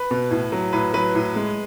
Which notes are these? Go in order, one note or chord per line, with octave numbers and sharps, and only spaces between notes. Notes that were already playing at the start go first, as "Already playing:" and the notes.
Already playing: B4
B2
A2
F#3
A2 B4
F#3 B4
A2
G#3